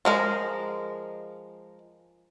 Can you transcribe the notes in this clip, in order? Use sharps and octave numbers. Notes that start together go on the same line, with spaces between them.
F3 G#3 A#4